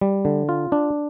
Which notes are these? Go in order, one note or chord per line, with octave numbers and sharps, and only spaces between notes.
G3
D3
F4
D4